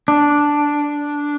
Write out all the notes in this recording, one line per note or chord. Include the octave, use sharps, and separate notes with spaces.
D4